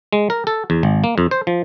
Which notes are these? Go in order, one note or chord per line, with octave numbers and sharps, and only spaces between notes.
G#3
A#4
A4
E2
G#1
A#3
F2
C5
F3